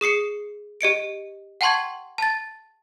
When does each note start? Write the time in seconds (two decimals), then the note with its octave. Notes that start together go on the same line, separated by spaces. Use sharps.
0.01 G#4 D#6 C7 C#7
0.81 G4 D#5 C#7 D7
1.61 F#5 G5 A5 C6 C#6 G#6
2.18 A5 A6